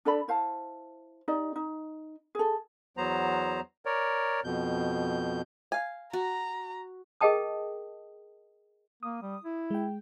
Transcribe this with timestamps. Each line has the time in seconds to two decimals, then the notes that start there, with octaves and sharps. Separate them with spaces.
0.05 D4 A4 D5 B5
0.28 E4 C5 F5 A5
1.28 D#4 G4 D5 D#5
1.56 D#4
2.35 G#4 A4
2.97 E2 F#3 B3 C5 A#5
3.85 A#4 C#5 D5
4.44 F2 B2 G6
5.72 F5 G#5
6.13 F#4 A#5
7.21 G#4 A#4 D#5 G5 A5 D#6
9.03 A#3 D#6
9.22 G3
9.44 E4
9.71 G#3 G5